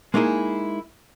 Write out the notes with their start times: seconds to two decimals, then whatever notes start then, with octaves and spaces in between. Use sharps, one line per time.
0.14 G#3 A#3 D#4 E4 G#4